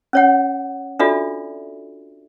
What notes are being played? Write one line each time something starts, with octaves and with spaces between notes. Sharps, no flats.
C#4 C#5 F#5
D4 F4 F#4 A4 D5 E5